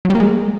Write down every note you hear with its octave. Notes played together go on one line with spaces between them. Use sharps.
F#3
G3
A#3
G#3